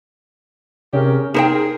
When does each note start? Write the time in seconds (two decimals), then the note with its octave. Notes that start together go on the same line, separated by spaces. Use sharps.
0.93 C3 C#4 G4 G#4 A#4
1.34 D#4 G#4 A#4 C5 G5 E7